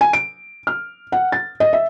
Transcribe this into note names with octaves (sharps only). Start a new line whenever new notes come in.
G#5
D7
F6
F#5
A6
D#5
E5